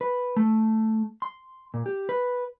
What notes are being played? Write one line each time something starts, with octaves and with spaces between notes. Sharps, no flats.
B4
A3
C6
A#2
G4
B4